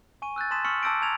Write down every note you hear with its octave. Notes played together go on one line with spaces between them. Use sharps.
G#5 C#6 D#7
E6 F#6 G6 A6
A5 C6 D#6 A6 B6 E7
C#6 E6 F6 B6 C#7 F#7
A5 D6 E6 G6 A#6 D7
A5 A#5 G#6 A6 F7